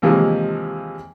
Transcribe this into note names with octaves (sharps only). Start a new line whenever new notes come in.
D#2 C3 E3 F3 G#3 A#3